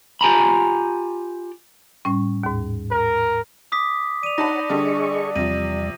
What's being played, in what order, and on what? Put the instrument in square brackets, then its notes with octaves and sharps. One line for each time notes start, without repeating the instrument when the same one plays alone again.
[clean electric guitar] F4 G4 G#5 A#5 B5
[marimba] A2 G3 C#4
D#2 G#2
[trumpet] A#4
[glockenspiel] D6 D#6 B6
[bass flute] D5 [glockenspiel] D#7 F7
[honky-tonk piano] D#4 A5 B5 [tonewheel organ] C#5 F#5 [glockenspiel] A#6
[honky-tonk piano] D3 G3 A4 [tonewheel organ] G#4 D#5 C#6
[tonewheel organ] E2 G3 [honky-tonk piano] C3 F3 [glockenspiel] A#6 D#7